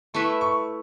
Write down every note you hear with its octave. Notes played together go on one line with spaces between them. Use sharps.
A3 E4 B4 E5 C#6
C#6